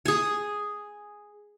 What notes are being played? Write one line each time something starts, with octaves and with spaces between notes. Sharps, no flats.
G#4 G#5